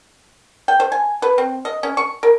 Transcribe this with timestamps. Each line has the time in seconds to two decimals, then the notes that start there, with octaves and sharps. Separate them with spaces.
0.68 G5
0.80 C5
0.92 G#5
1.22 B4
1.38 C4
1.65 D#5
1.83 C#4
1.97 C#6
2.23 A#4